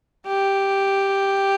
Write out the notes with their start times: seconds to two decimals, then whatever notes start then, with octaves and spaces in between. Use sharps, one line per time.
0.26 G4